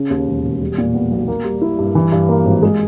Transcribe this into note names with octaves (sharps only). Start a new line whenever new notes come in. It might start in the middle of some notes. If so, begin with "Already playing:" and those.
Already playing: C#3
D#2
E1
E1
G3
A#2
B3
B1
A#3
G3
E4
G2
E3
G2
A#3
G#1
G#3